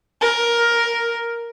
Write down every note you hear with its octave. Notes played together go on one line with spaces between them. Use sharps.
A#4